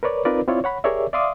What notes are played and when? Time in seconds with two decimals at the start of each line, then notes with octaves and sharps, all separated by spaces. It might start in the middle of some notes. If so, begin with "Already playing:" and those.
0.03 A#4 B4 C#5 D5
0.25 C4 D#4 F4 A#4 B4 D5
0.47 C4 E4 F4 C#5 D5
0.64 C#5 F#5 B5
0.84 G4 G#4 A#4 C#5 D5 E5
1.13 D5 E5 F5 C6 D6 D#6